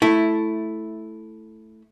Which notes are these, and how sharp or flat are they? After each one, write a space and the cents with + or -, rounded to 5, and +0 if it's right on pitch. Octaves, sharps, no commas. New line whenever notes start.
A3 -5 E4 +0